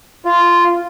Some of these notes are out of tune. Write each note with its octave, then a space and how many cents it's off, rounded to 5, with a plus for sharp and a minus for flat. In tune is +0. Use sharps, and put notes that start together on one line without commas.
F4 -10